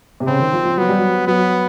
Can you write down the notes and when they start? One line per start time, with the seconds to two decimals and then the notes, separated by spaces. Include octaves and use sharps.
0.20 C3
0.27 C#3 C4
0.40 D#3
0.53 F3
0.65 F3
0.78 F#3 B3
0.89 G3
0.98 F#3
1.27 F#3 B3